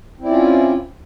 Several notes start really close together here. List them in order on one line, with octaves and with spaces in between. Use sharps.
C4 E4 D5 C#4 F4